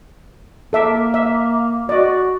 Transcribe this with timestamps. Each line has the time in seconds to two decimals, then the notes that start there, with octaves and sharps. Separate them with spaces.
0.73 A#3 A4 E5 D6
1.14 E5
1.89 F#4 D5 D#5